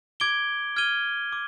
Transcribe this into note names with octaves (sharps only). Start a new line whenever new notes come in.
D6 G#6 D7 G7
F6 G#6 D#7 G7
D6